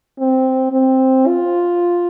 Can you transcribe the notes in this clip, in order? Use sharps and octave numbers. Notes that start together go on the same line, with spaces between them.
C4
C4
F4